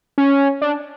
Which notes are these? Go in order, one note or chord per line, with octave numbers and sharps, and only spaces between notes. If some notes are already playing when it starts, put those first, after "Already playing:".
C#4
D4